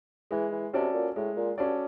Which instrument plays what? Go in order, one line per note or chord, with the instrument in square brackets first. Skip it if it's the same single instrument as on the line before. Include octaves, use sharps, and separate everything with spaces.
[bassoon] E3 [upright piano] G#3
[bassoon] E3
[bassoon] C3 [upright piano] C#4 F#4 A4 D5
[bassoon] A#2
[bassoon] A2 [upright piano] G#3
[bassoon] A#2
[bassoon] G2 [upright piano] C#4 F#4 A4 D5